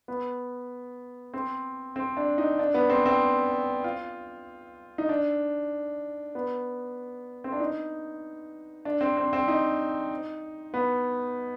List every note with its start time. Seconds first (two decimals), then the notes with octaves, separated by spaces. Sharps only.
0.08 B3
1.34 C4
1.96 C4
2.17 D4
2.38 D#4
2.59 D4
2.74 B3
2.90 C4
3.06 C4
3.84 F4
4.98 D#4
5.09 D4
6.35 B3
7.44 C4
7.52 D4
7.60 D#4
8.85 D4
9.01 C4
9.17 C4
9.33 C4
9.48 D#4
10.74 B3